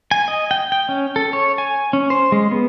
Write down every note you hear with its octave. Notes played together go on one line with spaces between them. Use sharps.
G#5
D#5
G5
G5
C#4
A4
C#5
G#5
C#4
C5
G#3
B3